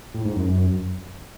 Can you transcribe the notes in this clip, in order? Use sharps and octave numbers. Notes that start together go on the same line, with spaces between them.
A2
G#2
F#2